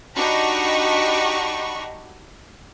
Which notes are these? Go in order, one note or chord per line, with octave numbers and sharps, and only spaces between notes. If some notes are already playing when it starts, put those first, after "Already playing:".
D4 D#4 F#4 G4 B5 C#6